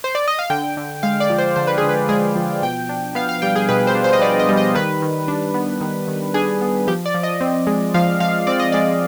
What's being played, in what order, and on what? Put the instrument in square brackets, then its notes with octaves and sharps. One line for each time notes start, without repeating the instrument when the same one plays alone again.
[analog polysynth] C5
D5
D#5
F5
D3 G5
D3
G#3 F5
D5
F3
C5
D3 C5
B4
D3 G#4
B4
G#3 G#4
F3
B2 G5
D4
B3 F5
F5
G3 G5
G#4
B2 B4
C5
D4
C5
D#5
B3 D5
D#5
G3
D#5
D#3 B4
D#3
D4
B3
D#3
D#3
D4 G#4
B3
F3 G4
D5
F3
D#5
C4
G#3
F3 F5
F3 F5
C4 D5
D#5
G#3 D5